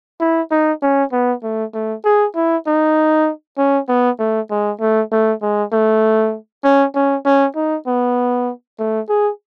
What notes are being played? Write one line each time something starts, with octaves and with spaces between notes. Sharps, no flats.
E4
D#4
C#4
B3
A3
A3
G#4
E4
D#4
C#4
B3
A3
G#3
A3
A3
G#3
A3
C#4
C#4
C#4
D#4
B3
A3
G#4